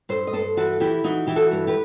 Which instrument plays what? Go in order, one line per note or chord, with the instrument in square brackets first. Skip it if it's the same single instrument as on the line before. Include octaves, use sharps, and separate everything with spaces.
[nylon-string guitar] G2 A4 C5
D#5
G2 A4 C5
E3 F#4 A4
E3 E4 G4
E3 D#4 F#4
E3 G4
F#4 A4
G2
G4 B4